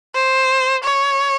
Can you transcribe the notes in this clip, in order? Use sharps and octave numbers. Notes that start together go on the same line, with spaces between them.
C5
C#5